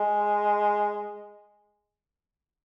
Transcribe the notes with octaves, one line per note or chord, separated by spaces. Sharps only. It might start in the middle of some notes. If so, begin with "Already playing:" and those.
Already playing: G#3